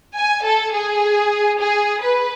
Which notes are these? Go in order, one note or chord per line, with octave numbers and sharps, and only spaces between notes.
G#5
A4
G#4
G#4
B4